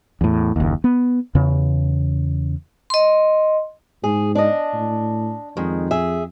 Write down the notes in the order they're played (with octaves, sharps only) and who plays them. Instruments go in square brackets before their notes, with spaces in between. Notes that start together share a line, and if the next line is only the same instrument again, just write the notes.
[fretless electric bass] E2 A2
F#1 D#2
B3
E2 C#3
[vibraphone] D#5 C6
[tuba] G#2 [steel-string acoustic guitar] G#4
[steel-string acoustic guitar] D4 D#5
[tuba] A2
[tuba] F2 [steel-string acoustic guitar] D#3 G#3
[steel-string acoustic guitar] G#4 E5